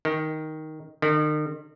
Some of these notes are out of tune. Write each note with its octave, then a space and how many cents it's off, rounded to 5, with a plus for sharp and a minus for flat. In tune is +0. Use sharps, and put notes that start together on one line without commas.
D#3 +5
D#3 -40